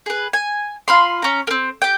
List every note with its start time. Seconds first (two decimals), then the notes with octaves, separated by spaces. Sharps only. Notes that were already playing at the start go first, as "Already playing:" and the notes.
0.06 G#4 B4
0.33 G#5
0.88 F4 B5 C6
1.22 C#4 A#5
1.47 A#3 C4
1.82 G4 G5